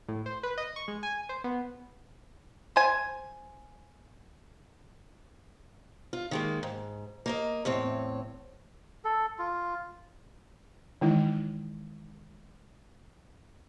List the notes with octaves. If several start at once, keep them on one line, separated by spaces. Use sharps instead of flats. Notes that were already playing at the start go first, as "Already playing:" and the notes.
A2
C5
B4
D#5
C#6
G#3
G#5
C5
B3
C5 G#5
F4
D#3 G#3 A#3
G#2
A#3 A#4 D#5
E2 A2 C4 C#5
A4
F4
D#3 E3 G#3 D#4 E4